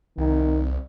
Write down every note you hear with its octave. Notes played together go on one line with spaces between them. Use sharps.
C2 D#3